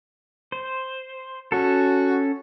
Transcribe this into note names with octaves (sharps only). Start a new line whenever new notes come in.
C5
C#4 F#4 A4